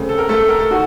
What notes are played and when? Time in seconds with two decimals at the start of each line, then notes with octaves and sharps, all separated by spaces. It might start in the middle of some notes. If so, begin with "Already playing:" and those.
Already playing: C#3 A3 C4
0.09 A4
0.18 A#4
0.29 A3 A4
0.48 A#4
0.59 A4
0.71 D#4 F#4